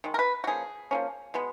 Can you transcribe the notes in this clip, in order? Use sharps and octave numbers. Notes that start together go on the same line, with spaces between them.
D#3 G#3
A#4
B4
F#4
F3 A#3 C#4 G#4
F3 A#3 C#4
B2 G#3 B3